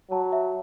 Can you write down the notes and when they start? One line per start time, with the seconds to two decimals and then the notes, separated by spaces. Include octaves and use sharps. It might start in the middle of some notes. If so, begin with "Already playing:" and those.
0.11 F#3 A5
0.32 E5